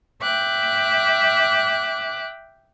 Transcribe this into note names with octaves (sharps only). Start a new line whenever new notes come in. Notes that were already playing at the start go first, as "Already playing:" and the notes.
E5 G5 D6 F#6